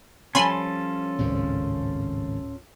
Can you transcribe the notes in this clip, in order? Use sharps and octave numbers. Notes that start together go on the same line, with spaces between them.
F3 G3 C#4 F4 A4 G#5 B5 C6
D1 G#1 F#2 C#3